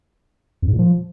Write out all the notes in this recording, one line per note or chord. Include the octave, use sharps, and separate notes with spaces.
F2
G#2
A#2
F3